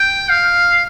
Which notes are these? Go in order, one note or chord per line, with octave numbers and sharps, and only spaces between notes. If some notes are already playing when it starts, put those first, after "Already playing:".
Already playing: G5
F5